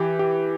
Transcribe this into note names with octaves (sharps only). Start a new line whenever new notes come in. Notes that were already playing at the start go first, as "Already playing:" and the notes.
Already playing: E3 G4
G4